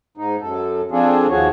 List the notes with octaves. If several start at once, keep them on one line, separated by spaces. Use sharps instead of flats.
G#2 D#4
F#2 A4
F3 C4 D4 F4 G#4 A4
D#2 F3 F#4 G#4 C#5